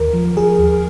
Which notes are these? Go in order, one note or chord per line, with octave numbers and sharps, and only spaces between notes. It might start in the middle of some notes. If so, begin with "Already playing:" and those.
Already playing: D#2 A#4
F3
F3 G#4
D#2